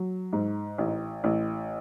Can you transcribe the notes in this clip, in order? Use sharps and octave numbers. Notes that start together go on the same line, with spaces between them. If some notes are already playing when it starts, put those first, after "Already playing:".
Already playing: F#3
G#2
A1
A1